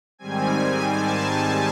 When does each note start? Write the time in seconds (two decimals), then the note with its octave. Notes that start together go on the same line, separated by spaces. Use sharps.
0.19 G#2 D#3 G3 C4 G#5
0.95 A5